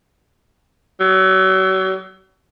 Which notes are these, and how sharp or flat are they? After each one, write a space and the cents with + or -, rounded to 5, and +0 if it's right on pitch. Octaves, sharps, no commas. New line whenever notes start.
F#3 +35